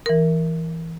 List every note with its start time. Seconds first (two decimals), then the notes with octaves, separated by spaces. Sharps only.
0.06 E3 A#4